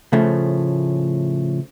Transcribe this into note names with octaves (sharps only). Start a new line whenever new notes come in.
A2 C#3 F3 A3